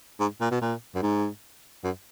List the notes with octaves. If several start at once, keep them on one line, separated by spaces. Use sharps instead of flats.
G#2
A#2
B2
A#2
F#2
G#2
F#2